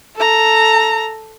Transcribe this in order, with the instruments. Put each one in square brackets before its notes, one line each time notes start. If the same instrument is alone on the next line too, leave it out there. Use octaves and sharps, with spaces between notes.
[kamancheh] A4 A#5